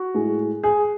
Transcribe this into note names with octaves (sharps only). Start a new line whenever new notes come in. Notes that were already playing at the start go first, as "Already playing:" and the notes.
Already playing: F#4
A2 G#3
G#4